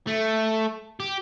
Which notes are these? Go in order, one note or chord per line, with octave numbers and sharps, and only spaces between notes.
A3
G4